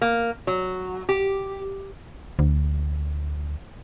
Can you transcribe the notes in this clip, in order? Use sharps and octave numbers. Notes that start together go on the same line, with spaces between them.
A#3
F#3
G4
D2